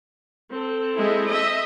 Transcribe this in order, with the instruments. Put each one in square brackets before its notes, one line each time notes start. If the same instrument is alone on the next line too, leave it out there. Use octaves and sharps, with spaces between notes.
[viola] C4 A4
[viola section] G#3 E4
D#5 E5